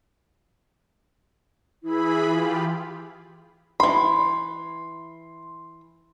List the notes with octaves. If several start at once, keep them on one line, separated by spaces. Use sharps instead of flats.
E3 E4 G#4 B5
F4 G4
E3 B5 C6